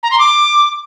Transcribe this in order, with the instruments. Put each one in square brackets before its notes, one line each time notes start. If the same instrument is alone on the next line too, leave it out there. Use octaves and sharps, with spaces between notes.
[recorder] A#5
C6
D6